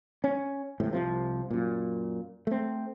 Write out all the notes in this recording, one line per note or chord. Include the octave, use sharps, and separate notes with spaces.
C#4
G#1 A2 C3
C2 C3 F3
F#2 A#2
A3 C4